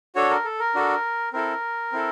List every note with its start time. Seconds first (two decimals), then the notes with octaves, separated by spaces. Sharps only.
0.15 D4 F#4 A4 C#5
0.31 A#4
0.45 A4
0.60 A#4
0.75 D4 F#4 A4
1.33 C4 E4 A4 A#4
1.92 C4 E4 A4